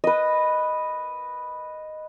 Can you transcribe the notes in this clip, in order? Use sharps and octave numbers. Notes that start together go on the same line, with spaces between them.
B4 D#5